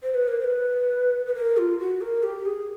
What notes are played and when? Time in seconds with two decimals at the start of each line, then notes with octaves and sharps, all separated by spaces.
0.03 C5
0.14 B4
0.28 A#4
0.40 C5
0.44 B4
1.26 B4
1.35 A#4
1.57 F4
1.79 F#4
2.01 A#4
2.23 G4
2.46 G#4